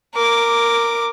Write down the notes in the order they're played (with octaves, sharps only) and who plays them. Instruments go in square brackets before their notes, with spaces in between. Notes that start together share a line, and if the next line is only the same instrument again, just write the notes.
[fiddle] A#4 D6